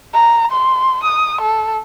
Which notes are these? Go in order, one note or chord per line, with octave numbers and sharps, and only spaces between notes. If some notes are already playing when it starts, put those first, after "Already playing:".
A#5
C6
D#6
A4